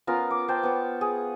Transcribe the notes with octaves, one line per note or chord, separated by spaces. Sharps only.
B3 C#4 F4 A#4
D6
C5 G5 A5
B3 B4 C#5
G#4